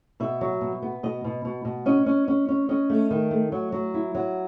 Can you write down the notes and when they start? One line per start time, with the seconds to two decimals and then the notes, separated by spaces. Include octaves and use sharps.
0.20 B2 E5
0.41 F#3
0.61 B2
0.82 B3
1.03 B2 D#5
1.24 B2
1.45 B2
1.65 B2
1.86 C#4 D#5
2.06 C#4
2.28 C#4
2.49 C#4
2.69 C#4 D#5
2.90 A3
3.10 D#3
3.31 A3
3.52 F#3
3.72 F#3
3.94 E4
4.15 F#3